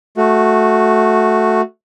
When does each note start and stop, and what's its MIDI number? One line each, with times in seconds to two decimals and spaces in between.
0.17 1.61 57
0.17 1.61 66